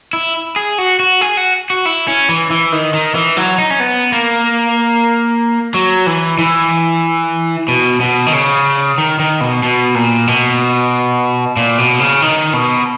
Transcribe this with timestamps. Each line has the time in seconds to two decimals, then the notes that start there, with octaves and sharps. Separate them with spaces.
0.13 E4
0.56 G#4
0.78 F#4
1.00 F#4
1.21 G#4
1.37 F#4
1.70 F#4
1.86 E4
2.08 C#4
2.29 E3
2.50 E3
2.72 D#3
2.94 D#3
3.15 E3
3.37 F#3
3.58 D#4
3.70 C#4
3.80 B3
4.12 A#3
5.74 F#3
6.07 E3
6.39 E3
7.68 B2
8.01 B2
8.26 D#3
8.33 C#3
8.98 D#3
9.19 D#3
9.41 B2
9.63 B2
9.95 A#2
10.27 B2
11.57 A#2
11.78 B2
12.00 C#3
12.22 D#3
12.53 B2